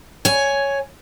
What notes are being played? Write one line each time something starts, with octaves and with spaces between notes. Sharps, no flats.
C#5 G#5